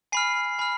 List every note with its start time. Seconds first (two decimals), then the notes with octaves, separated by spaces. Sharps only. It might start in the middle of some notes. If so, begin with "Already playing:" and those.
0.12 G#5 B5 F6 C7
0.59 G#5 B5 F6